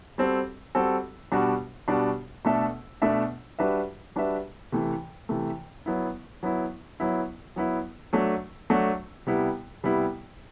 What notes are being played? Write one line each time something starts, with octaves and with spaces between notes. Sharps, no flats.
G3 C4 F#4 A4
G3 C4 F#4 A4
B2 G3 D4 F#4
B2 G3 D4 F#4
B2 A3 D4 A4 E5
B2 A3 D4 A4 E5
G3 D4 F#4 B4 E5
G3 D4 F#4 B4 E5
C3 E3 A3
C3 E3 A3
F#3 B3 E4
F#3 B3 E4
F#3 B3 E4
F#3 B3 E4
F#3 A3 D4 F#4
F#3 A3 D4 F#4
C3 G3 B3 E4
C3 G3 B3 E4